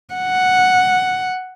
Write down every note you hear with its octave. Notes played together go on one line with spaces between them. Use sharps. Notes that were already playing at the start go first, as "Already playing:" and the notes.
F#5